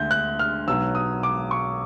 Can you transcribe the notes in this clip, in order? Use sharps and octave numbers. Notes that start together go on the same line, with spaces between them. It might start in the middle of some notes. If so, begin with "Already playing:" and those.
Already playing: D2 D3 G6
F#6
F6
B1 B2 F#3 E6
D#6
D6
C#6